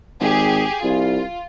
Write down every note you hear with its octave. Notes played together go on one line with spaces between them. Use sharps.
G#1 G4 G#4
C2 F4